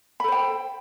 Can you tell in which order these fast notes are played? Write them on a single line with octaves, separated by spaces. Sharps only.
B5 A4 C5 G5